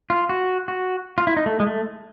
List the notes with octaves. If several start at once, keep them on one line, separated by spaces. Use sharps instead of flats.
F4
F#4
F#4
F4
E4
D#4
A3
G#3
A3